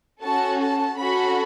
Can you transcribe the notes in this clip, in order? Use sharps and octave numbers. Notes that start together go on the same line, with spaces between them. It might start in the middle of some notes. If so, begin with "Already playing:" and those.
C#4 F#4 A4 A5
A5
C#4 F#4 A4 B5